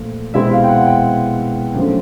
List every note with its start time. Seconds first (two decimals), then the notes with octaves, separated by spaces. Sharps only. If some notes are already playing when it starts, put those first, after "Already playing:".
Already playing: A#2 F3 A3
0.34 B2 G#3 C4 E4 E5
0.52 F5
0.64 G5
0.69 F#5
0.87 G5
1.74 F#2 D3 F3 A3